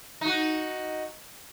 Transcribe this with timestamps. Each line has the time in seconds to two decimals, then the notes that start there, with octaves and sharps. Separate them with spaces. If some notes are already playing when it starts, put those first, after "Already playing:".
0.21 D#4 F#4